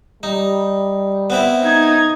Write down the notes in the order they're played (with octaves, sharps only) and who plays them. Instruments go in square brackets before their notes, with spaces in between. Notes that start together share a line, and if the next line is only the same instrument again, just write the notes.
[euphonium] G3 [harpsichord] D#4
[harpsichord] B3 C4 E4
[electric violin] D#4 G#6